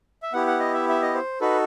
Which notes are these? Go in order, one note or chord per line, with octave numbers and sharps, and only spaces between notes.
E5
B3 E4 G4 F#5
F#5
D#5
E5
E5
D#5
C5
D#4 F#4 A4 B4